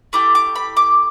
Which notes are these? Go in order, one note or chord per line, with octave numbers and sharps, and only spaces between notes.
A3 E4 G4 D6
D6
B5
D6